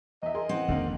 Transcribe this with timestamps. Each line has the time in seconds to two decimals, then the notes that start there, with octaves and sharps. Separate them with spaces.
0.23 E2 D#5 E5
0.35 G#4 A#4 C6
0.49 E3 C4 F#5
0.68 F2 D3 D#3 A#3